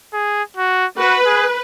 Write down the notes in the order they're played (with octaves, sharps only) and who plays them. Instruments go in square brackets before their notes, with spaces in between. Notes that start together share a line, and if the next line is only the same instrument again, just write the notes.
[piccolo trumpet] G#4
F#4
[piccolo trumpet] F#4 [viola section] B4
[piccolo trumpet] G#4